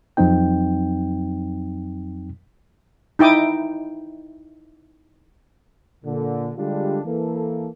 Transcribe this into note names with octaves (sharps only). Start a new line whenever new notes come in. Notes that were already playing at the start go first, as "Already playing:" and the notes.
F2 F#3 C4 D#4 G5
D#4 E4 G5 D6 D#6
A#2 D3
D3 G3 G#3 D4 F4 G4
E3 A#3 A4